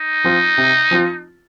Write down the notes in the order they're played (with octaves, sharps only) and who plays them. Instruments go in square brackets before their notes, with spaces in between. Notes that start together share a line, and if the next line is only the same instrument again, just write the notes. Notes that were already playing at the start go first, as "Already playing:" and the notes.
Already playing: [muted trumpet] D#4
[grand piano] F3 C4 F4
C3
F3 C4 F4